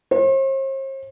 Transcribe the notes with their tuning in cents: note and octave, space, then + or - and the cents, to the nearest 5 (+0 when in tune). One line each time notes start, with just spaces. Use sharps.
C5 +45